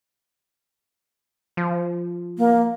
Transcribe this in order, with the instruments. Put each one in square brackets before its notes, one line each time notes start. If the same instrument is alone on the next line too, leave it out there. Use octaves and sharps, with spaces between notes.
[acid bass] F3
[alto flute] A#3